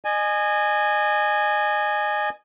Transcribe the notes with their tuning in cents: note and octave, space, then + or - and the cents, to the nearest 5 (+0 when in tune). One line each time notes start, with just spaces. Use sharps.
D#5 -35 G#5 +0